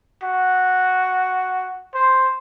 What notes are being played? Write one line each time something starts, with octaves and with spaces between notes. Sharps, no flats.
F#4
C5